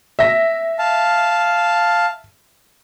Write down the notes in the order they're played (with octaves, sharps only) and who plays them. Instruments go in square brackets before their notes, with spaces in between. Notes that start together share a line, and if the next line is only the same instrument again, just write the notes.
[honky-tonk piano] E5 A#6
[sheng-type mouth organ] F5 A5